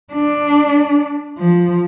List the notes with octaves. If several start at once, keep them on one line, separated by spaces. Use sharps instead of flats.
D4
F3